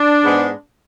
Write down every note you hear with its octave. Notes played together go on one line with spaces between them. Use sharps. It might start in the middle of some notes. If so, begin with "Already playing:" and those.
Already playing: D4
G#2 G#3 B3